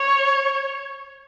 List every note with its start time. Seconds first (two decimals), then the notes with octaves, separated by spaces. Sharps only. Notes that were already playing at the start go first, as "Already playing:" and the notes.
Already playing: C#5